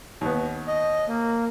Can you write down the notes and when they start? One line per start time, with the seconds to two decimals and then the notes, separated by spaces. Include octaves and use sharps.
0.21 D#2 B3
0.67 D#5
1.08 A#3